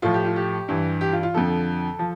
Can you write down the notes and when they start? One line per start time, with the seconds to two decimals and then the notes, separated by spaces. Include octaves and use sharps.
0.02 A2 F3 F4
0.14 G4
0.25 F4
0.36 G4
0.68 G2 E3
1.01 G4
1.13 F4
1.23 F4
1.34 F2 D3 F3 A4
1.99 F3